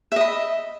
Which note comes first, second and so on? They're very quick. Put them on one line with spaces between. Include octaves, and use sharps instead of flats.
E5 D#5 B5